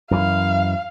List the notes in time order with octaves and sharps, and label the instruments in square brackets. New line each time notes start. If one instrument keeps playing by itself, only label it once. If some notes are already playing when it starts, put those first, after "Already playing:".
[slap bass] F#2 E3 [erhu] F5